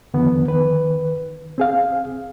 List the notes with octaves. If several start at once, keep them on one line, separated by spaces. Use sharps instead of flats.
F2 D3 D#3 F3 B3
D#3 B4
C4 G#4 F5